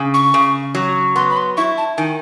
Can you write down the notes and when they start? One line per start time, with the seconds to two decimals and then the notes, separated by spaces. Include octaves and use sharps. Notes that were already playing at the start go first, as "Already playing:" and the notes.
Already playing: C#3
0.14 C#6
0.34 C#3
0.75 F#3
1.16 B3 C6
1.30 B5
1.37 C6
1.57 E4 C#6
1.78 A5
1.98 D#3 G#5